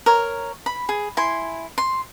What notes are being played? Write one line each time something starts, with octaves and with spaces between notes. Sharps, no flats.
A#4 C#5
B5
G#4
E4 G#5 C6
C6